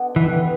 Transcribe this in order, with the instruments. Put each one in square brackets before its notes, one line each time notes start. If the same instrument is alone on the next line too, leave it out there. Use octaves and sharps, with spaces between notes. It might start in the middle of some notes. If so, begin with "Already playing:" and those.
Already playing: [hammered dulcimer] B2 D3 B3 D4
[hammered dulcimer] G2 [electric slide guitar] E3